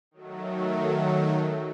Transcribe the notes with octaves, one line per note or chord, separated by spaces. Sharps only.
D#3 F#3 A3